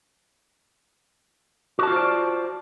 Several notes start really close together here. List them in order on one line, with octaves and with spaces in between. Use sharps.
F#4 A5 F4 C5 D5